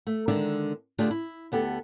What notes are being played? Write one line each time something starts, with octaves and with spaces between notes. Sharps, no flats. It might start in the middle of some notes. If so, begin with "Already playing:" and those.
A3
D3 D#3 G#3 D4 D5 E5
D3 A3 D4 F4 G4 G#4
E4
D2 B3 G4 A4